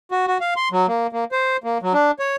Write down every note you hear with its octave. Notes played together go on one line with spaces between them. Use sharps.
F#4
F#4
F5
C6
F#3
A#3
A#3
C5
A#3
F#3
D4
C#5